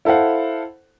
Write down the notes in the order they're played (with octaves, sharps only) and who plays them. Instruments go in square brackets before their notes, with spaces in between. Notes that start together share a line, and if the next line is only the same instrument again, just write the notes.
[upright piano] E4 A4 C5 F5 F#5